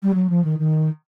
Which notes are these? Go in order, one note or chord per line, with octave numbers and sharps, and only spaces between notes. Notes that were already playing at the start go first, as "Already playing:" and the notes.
G3
F#3
F3
D#3
D#3